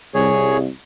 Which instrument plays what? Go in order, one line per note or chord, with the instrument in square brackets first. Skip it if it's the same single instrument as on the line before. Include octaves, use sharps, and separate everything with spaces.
[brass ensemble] C2 [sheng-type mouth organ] G#4 C#5